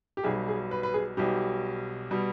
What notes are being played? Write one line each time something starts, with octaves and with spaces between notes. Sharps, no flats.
G4
B1 B2 G3 G#4
G#4
B4
B4
G#4
B1 B2 G3 G4
B2 G3